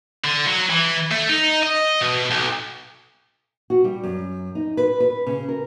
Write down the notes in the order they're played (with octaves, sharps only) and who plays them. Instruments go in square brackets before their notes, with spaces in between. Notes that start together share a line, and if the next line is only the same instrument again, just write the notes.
[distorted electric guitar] D3
F#3
E3
A3
D#4
D#5
B2
B1
[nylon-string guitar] F#4
G3
F#2
D#4
B4
B4
C#3
A#4